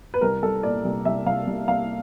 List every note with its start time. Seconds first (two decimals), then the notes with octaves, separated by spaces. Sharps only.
0.14 B4
0.21 C2 A#4
0.42 C2 A4
0.63 A#2 D5
0.85 C2
1.05 C2 E5
1.26 C2 F5
1.47 C2
1.68 C2 F5